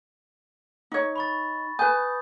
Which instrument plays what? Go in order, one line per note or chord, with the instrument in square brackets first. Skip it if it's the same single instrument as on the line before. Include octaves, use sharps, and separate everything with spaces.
[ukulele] D#4 C#5
[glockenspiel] B5 C#6 A6
[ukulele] B4 G#5 [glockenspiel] D#6 G6